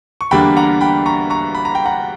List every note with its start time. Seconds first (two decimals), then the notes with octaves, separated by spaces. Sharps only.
0.21 C#6
0.31 E2 D3 G3 A#3 D4 G5 B5
0.56 F#5 A#5
0.81 G5 B5
1.06 A#5 C#6
1.30 A#5 C#6
1.55 B5
1.65 A#5
1.75 G5
1.86 F#5 A#5